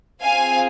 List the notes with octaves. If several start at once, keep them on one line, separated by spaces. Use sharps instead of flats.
C4 F4 G#4 F5 G#5